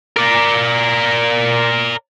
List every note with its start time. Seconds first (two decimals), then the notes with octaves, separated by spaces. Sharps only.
0.17 A#4 D5